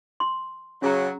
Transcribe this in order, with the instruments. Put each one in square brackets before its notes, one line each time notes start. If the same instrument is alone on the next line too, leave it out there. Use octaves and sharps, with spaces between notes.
[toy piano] C6
[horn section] C#3 F#3 [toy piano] C#4 G#4 A#5